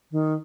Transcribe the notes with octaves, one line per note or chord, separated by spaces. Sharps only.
D#3